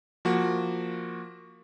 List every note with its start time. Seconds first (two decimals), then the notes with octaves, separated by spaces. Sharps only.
0.25 F3 A#3 F#4